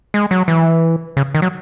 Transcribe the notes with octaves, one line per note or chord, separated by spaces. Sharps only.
G#3
F#3
E3
C#3
D#3
F#3